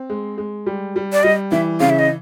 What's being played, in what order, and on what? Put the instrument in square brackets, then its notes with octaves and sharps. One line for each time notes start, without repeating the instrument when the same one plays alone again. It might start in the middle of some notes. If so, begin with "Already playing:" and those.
Already playing: [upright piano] C4
G#3
G#3
G3
G3
[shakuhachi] D5
[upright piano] G3 [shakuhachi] D#5
[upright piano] E3 [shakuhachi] E5
[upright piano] C#3 [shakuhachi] F5
[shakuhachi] E5
D#5